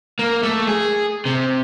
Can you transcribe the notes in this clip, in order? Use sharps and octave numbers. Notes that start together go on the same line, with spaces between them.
A#3
A3
G#4
C3